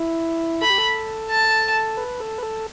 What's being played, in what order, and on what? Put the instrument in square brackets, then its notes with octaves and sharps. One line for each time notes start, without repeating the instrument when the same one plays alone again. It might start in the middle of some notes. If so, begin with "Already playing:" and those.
Already playing: [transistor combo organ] E4
[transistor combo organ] A4 [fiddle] B5
[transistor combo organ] G4
A4
[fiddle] A5
[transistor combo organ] B4
A4
B4
A4